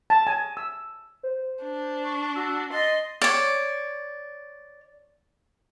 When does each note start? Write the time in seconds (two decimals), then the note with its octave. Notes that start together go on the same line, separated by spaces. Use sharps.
0.10 A5
0.27 G#5
0.57 E6
1.23 C5
1.63 D4
2.04 C#6
2.35 F#4 E6
2.72 D#5 C6 A6
3.22 C#5 D5